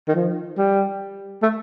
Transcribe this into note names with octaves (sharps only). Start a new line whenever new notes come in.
D#3
F3
G3
A3